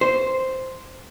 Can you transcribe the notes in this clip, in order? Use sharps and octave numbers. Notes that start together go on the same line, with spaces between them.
C5